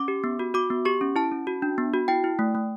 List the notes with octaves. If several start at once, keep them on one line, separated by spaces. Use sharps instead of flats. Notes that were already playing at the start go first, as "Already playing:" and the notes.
Already playing: C#4 D6
G4
B3
F#4
F#4 D6
B3
G4 C#6
C#4
E4 A5
C#4
F#4
D4
B3
F#4
E4 G5
E4
A3
A3